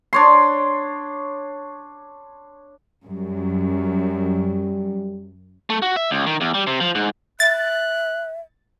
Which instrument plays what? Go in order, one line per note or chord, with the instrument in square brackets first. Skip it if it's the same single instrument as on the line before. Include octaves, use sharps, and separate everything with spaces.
[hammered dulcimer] D4 C#5 C6
[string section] F#2 [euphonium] G3
[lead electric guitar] A3
F#4
E5
C#2
D#3
E2
G3
C3
F3
G#2
[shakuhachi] E5 [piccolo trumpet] F#6 [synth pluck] A6